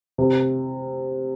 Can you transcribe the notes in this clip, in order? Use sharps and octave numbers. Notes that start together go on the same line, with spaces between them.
C3